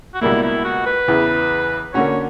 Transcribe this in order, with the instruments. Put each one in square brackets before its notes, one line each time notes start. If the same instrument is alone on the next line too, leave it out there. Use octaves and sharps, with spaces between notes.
[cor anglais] F#4
[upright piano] C#2 B2 G3 A#3 [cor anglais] E4
[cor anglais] E4
F#4
B4
[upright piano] E2 C#3 E3
[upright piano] D3 A#3 C#4 F#4 [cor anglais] C#5